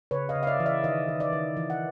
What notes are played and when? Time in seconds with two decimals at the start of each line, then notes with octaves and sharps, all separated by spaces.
0.11 C#3 B4 C#5
0.29 D#5 F5
0.35 C#3
0.43 F5
0.47 D5 E5
0.60 E3
0.66 D5 E5
0.84 D#3 D#5 F5
1.08 D#3
1.20 D5 E5
1.33 D#3
1.57 E3
1.70 F#5